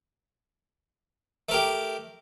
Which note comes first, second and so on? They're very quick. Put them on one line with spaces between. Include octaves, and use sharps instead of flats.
A3 A#4 G4